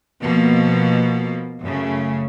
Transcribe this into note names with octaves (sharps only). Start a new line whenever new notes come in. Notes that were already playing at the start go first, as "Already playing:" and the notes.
B2 F3 A#3
F#2 C#3 A3